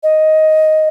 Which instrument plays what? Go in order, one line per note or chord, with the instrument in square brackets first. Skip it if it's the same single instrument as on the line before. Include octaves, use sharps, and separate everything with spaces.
[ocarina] D#5